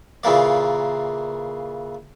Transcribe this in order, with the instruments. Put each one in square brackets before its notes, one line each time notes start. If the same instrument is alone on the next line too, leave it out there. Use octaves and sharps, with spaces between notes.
[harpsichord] A#2 C#3 E3 A#3 D5